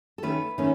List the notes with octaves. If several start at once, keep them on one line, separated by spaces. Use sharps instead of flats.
A4
D#3 A3 C#4 B4
D#3 A3 C#4